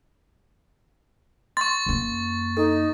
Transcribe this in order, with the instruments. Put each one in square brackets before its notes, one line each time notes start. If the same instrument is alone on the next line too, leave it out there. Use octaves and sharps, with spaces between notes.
[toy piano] C6 [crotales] C#6 A6
[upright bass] F#2 A#3
[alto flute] D#4 [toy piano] A4